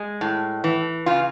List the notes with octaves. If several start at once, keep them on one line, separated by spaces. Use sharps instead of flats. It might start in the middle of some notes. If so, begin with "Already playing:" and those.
Already playing: G#3
A2
E3
C#3 F4